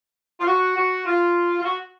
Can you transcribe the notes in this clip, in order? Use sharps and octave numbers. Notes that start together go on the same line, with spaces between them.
F4
F#4
F#4
F4
F4
F#4